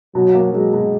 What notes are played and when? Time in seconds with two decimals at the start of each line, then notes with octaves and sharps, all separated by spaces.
0.15 B2 F#3
0.35 A#3
0.54 F#3 G#3
0.74 B2